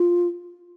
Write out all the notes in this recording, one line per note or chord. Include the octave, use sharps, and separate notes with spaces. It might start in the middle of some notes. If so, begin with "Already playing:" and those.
Already playing: F4